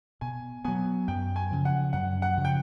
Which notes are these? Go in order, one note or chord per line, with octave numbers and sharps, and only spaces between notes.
B2 G#5
F#3 B3 G#5
F#2 G5
G#5
C#3 F3
F#5
F#2 F#5
F#5
C#3 F3
G5